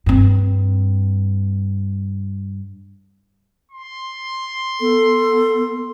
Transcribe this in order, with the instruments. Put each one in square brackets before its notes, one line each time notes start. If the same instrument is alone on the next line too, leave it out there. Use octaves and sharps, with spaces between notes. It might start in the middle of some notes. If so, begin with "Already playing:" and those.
[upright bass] G2 C4
[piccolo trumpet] C6
[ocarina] B3 [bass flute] A4